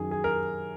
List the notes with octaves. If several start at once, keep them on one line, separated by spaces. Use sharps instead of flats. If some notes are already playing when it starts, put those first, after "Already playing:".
Already playing: F#2 D#3 G#4
G#4
A#4